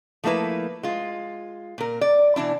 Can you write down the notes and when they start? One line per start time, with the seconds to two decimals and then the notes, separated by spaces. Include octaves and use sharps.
0.24 F3 A3 A#3 E4 B4
0.83 G#3 F4
1.78 A#2 A#4
2.01 D5
2.36 B2 E3 D4 E4